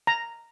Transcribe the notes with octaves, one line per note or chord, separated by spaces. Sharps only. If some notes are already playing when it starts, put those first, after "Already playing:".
A#5